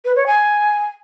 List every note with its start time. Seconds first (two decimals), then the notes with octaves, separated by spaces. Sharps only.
0.05 B4
0.16 C#5
0.27 G#5